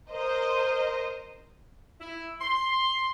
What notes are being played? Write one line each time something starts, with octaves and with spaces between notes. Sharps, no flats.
A#4 C5 D#5
E4
C6